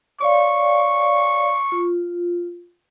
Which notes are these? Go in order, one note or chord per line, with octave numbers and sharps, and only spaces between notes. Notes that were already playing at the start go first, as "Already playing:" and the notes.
C#5 D5 F5 C#6
F4